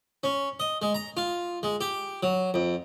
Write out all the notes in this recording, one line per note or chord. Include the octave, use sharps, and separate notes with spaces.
C#4
D#5
G#3
A#5
F4
G#3
G4
F#3
F2